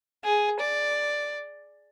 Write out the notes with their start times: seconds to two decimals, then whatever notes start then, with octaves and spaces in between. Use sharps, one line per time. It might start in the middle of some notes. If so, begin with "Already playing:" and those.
0.25 G#4
0.60 D5